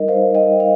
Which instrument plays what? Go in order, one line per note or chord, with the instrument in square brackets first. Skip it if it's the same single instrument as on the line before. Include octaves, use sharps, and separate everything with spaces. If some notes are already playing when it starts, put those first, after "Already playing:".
Already playing: [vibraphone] G3 D#4 A#4 D#5
C5 F5
D#5 G5
F5